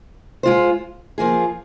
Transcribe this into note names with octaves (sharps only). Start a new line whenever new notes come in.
G#3 F4 C5
F3 A#3 F4 G#4